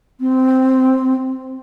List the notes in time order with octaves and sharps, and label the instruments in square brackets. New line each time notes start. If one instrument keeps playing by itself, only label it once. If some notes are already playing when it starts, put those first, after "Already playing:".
[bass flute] C4